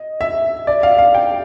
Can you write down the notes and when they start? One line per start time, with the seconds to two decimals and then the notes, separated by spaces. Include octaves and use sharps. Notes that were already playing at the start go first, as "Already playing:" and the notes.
Already playing: D#5
0.21 E5
0.67 D5
0.83 F5
0.99 F5
1.15 G5